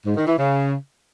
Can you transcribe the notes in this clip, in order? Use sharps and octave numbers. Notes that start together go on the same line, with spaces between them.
G#2
D#3
E3
C#3